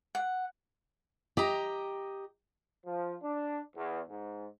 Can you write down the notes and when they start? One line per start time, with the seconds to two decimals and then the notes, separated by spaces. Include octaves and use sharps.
0.15 F#5
1.37 G4 D#5 A#5
2.86 F3
3.23 D4
3.76 E2
4.09 G#2